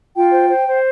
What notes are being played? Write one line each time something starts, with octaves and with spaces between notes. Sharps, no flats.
F4 G5
C5
C5
C5